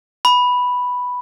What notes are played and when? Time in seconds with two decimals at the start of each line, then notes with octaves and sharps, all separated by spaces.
0.25 B5